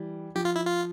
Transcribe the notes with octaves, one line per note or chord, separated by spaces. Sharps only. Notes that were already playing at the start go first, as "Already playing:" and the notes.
Already playing: E3 G3
F3 G4
F4
E4
F4